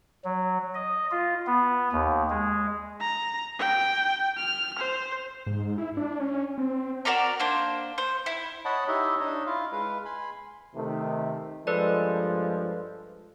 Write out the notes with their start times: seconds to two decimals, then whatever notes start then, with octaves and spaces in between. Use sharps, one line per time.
0.24 F#3
0.75 D#5
1.11 F4
1.47 B3
1.92 D#2
2.30 G#3
3.01 A#5
3.59 G5
4.37 F6
4.79 C5
5.46 G#2
5.78 E4
5.97 D4
6.20 C#4
6.58 C4
7.05 F#4 A#4 D5 A#5
7.40 A#3 D4 C5
7.98 C5
8.26 E4
8.65 C#5 D#5 F#5 A5 B5
8.88 D#4 E4 G4 C#5 D#5 E5
9.20 D4 D#4 C#5 D#5
9.46 E4 F4 F5
9.72 G#3 B4 F5
10.05 G#5 B5 C6
10.75 C3 D#3 A3
11.67 G2 F3 G#3 A4 B4 D5